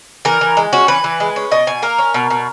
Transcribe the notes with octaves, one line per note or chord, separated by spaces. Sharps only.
E3 A#4
E3
G#3
C#4 F#4
E3 B4
E3
G#3
C#4
B2 D#5
B2 G#5
A#3 A#4
C#4
B2
B2